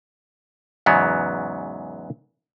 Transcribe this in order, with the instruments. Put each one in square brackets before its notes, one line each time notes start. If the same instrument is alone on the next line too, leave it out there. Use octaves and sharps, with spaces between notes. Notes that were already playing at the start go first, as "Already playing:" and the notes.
[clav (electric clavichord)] E2 G#2 C#3 F#3 B3